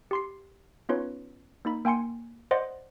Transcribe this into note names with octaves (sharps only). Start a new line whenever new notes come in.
G4 C6 C7
B3 C#4 D#4 F4 B4 C#5
A#3 D#4 B5
A#3 G5 G#5 C6 C#7
C5 D5 D#5 F#5 C6